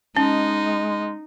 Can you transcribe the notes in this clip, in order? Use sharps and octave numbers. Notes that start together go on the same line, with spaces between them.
G#3 C#4 D#4